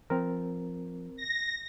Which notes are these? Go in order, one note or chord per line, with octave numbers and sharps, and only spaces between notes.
F3 C4 A#4
A#6